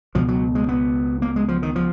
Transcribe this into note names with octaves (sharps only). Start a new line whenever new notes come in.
C#2 B2 F3
F#3
G#3
B3
A#3
G#3
F3
D#3
F3